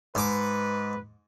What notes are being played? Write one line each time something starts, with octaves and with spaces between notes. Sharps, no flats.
G#2 B4 D6